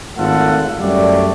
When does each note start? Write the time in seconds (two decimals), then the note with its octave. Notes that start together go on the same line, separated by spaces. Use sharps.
0.17 G#1 A3 F4 A4 F#5
0.79 F#2 G3 A3 D5